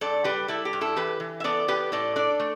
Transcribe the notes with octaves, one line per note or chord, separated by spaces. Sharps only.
G2 A4 D5
G3 G4 B4
G3 E4 A4
G4
G2
E4 A4
E3 G4 B4
E3
E5
B3 A4 D5
B3 G4 B4
A2 A4 D5
D4 A4 D5
A3